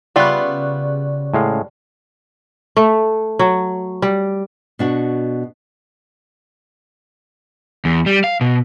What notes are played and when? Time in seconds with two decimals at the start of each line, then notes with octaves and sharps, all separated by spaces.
0.16 C#3 G3 B3 F4 D5 E5 C#6 F#6
1.34 A2 G#3 F5
2.77 A3
3.39 F#3
4.02 G3
4.79 B2 D4 F#4
7.85 E2
8.06 G3
8.24 F5
8.41 B2